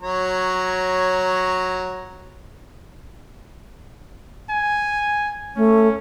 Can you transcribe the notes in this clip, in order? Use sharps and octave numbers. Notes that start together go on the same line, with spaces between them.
F#3 C#5 A#5
G#5
A3 C#4